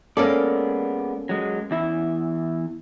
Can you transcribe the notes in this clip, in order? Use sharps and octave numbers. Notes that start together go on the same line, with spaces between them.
G#3 A#3 B3 C#4 A4 D5
F#3 G#3
E2 E4 E5